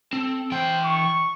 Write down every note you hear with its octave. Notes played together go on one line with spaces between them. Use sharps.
C4 A4
E3 C5 G5
C#6